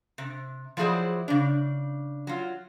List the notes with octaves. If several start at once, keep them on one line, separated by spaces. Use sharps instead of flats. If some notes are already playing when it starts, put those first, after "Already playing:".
C3
F3 F#3 E4 G#4 C5 D5
C#3 D4
F#3 F4